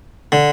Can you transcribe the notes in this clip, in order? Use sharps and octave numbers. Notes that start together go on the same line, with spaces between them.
D3